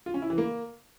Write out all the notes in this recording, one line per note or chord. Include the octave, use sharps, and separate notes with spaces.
F4
C#4
E4
E3
A#3